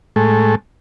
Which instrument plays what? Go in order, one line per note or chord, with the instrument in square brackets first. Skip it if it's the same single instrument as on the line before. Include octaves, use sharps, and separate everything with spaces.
[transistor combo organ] A2 G#3 A3